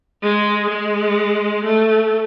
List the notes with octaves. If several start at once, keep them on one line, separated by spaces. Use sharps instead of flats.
G#3
G#3
A3